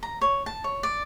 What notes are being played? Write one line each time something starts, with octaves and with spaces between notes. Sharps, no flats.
A#5
C#5
A5
C#5
D5